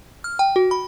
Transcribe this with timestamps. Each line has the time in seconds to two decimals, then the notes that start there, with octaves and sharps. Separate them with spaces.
0.24 F6
0.39 G5
0.56 F#4
0.71 B5